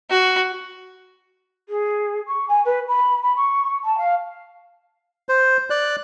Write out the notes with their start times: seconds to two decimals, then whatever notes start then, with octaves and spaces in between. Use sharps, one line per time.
0.10 F#4
1.69 G#4
2.26 C#6
2.48 G#5
2.65 B4
2.88 B5
3.22 B5
3.36 C#6
3.83 A5
3.98 F5
5.29 C5
5.70 D5 F#6